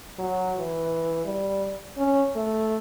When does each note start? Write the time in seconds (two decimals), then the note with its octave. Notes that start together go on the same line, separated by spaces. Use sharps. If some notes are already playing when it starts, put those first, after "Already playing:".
0.18 F#3
0.57 E3
1.25 G3
1.97 C#4
2.36 A3